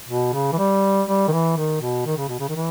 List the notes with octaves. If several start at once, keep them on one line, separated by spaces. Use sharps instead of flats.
B2
C#3
E3
G3
G3
D#3
E3
D#3
B2
D#3
C#3
B2
C#3
D#3
E3